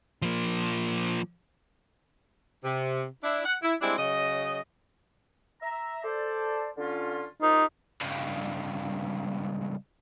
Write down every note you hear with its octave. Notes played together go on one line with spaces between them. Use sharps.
F3 A#3
C3
D4 E4
F#5
E4
G3 G#3 C4 D4 E4
C#3 F#3 D#5
E5 A#5
A4 C5 D5
D3 C#4 F4
C2 D#4 F4 G4
C#2 G2